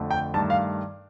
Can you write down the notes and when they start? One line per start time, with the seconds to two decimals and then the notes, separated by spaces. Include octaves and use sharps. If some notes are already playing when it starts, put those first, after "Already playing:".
Already playing: F2 D3 A3
0.11 G5
0.34 G2 D#3 A3 A5
0.50 F5